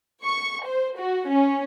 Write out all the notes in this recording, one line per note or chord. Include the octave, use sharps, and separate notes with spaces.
C#6
C5
F#4
C#4